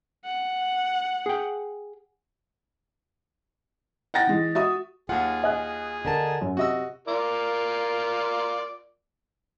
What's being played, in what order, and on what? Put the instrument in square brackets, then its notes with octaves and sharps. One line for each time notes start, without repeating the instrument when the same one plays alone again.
[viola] F#5
[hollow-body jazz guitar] G#4 G5
[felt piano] F#5 G5 A6 A#6
E3 G#3
F#4 E5 D#6
[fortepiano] D#2 F#5 [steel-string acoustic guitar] F4 [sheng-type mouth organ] G#4
[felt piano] D#5 G#5 F#6
[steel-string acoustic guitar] D3 A#4 A5
[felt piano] F#2 [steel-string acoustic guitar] F#3
[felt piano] C3 E5 [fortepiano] F#4 D#5 E6
[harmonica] F4 A#4 D5